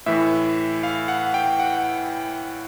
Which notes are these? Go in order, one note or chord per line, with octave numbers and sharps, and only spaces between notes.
A2 E3 E5
F5
F#5
G5
F#5